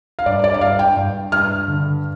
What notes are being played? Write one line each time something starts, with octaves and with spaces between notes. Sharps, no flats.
F5
G2 D5
D5
D5
G2 F5
G5
G2
G2 F6
D3